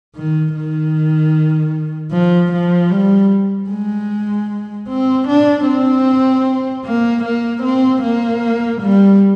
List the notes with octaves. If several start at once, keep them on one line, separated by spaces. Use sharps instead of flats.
D#3
D#3
F3
F3
G3
G#3
C4
D4
C4
A#3
A#3
C4
A#3
G3